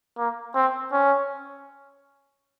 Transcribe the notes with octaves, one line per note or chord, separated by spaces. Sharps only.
A#3
C4
C#4